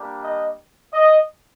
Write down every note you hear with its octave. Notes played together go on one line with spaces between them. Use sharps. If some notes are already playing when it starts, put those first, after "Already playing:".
Already playing: G3 A#3 D4 G4
D#5
D#5